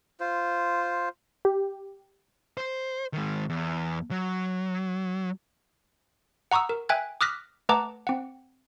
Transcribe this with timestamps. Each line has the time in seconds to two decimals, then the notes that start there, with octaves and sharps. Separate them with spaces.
0.20 F4 C5
1.45 G4
2.57 C5
3.13 D#3 G#3
3.50 E2
4.11 F#3
6.51 F#5 A#5 C#6 D#6 E6
6.69 A#4
6.89 E5 G5 G#5 F#6 G#6
7.21 D6 D#6 F6 F#6 A#6 B6
7.69 A3 B4 F#5 A5 A#5 D6
8.07 C4 F#5